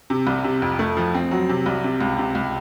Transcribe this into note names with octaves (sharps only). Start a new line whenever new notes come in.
C3
C2
C3
F2
A3
F3
C4
F#3
C3
C2
C3
C#2
C3
C#2